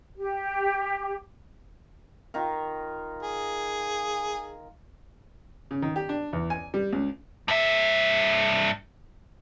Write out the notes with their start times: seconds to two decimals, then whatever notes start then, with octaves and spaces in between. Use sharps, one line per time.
0.17 G4
2.34 D#3 F4 A#4
3.22 G#4
5.71 C#3
5.82 D#3
5.96 G4
6.09 D4
6.33 E2
6.50 G#5
6.74 G3
6.93 C#2
7.48 G2 E5